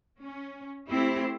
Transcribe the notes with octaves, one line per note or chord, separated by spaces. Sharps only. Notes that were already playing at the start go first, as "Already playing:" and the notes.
C#4
A3 C4 E4 G4